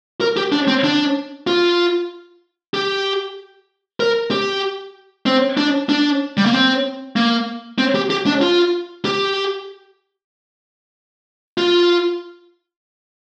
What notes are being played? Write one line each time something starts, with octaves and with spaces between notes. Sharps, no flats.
A#4
G4
D4
C4
D4
F4
G4
A#4
G4
C4
D4
D4
G3
A#3
C4
A#3
C4
G4
G4
D4
F4
G4
F4